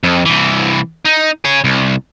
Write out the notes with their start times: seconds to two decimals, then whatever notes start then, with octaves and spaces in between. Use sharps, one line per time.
0.03 F2
0.26 C2 E3
1.05 D#4
1.45 G#4 C#5
1.64 C2